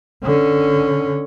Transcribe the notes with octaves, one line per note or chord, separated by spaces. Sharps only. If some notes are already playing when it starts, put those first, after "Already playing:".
D3 C#4